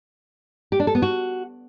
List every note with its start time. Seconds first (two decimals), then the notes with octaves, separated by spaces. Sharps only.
0.72 G4
0.80 D4
0.87 A4
0.95 B3
1.02 F#4